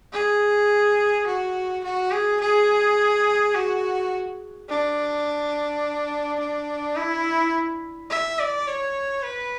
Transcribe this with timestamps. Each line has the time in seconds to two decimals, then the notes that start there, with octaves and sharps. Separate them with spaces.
0.12 G#4
1.27 F#4
1.84 F#4
2.11 G#4
2.41 G#4
3.54 F#4
4.69 D4
6.39 D4
6.96 E4
8.10 E5
8.39 D5
8.67 C#5
9.24 B4